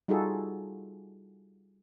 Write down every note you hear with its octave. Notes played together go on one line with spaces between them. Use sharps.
G3 D#4 F4 F#4 G#4 A4